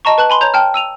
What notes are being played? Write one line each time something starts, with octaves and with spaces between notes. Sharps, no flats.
D#5 A5 A#5 C#6
B4 A5 F#6 F#7
G#5 B5 C6
C#5 A#5 G6 F7
G5 A5 F6
E6 D#7 F7